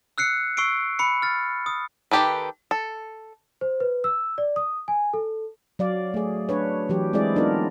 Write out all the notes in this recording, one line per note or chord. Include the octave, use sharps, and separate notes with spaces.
E6 F#6 C7 C#7
C#6 E6 C7 D7
B5 C#7
F6 A6
D#6
D#3 E3 G4 A4 B4
A4
C5
B4
E6
D5
D#6
G#5
A4
F#3 D5 F5
A3 G#4
D4 B4 C#5
E3 F#3 G4
G#3 C4 E4 G#4 D5
B3 D4 D#4 F4 A#4